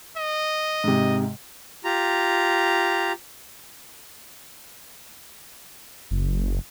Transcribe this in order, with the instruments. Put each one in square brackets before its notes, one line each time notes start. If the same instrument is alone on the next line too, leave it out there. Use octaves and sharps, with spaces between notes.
[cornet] D#5
[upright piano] G#2 C3
[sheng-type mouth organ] F4 G4 A#5
[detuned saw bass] F#1